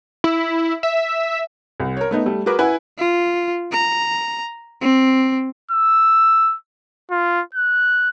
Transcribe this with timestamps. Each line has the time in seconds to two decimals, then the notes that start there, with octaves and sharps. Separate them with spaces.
0.24 E4
0.83 E5
1.80 C2
1.97 A#4 C#5
2.11 A3 B3 D#4
2.26 G3 A3
2.46 F#4 G#4 A#4 B4 D6
2.59 E4 B4 F#5 G#5
2.98 F4
3.72 A#5
4.82 C4
5.72 E6
7.11 F4
7.55 F#6